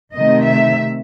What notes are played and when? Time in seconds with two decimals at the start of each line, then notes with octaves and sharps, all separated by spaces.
0.15 C3 D#3 A3 C4 D#5
0.46 E5